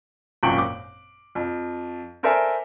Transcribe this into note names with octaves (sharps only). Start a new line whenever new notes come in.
G#1 F#2 A#2 G5 C#6 F#7
D6
F2
A4 A#4 C5 D5 E5 G#5